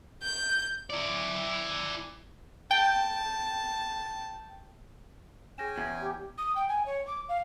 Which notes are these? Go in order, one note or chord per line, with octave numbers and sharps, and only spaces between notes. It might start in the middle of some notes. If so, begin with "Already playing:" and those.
G6
E4 D5
G5 A5
C#4 G#4 G5 G#5 A#6 E7
E2 G#6
G4
D#6
G5
G#5
C#5
D6
F5